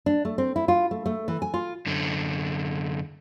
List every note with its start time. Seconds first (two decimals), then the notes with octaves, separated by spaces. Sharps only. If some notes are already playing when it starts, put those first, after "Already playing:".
0.06 D4
0.25 A3
0.38 C4
0.56 E4
0.68 F4
0.91 A3
1.06 A3
1.28 E3
1.42 G#5
1.54 F4
1.86 F#2 D3